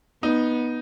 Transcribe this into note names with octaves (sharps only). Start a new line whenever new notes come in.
B3 D#4